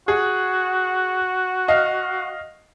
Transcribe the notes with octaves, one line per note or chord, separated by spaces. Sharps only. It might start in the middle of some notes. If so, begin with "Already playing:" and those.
F#4 G#4
D#5 F5 F6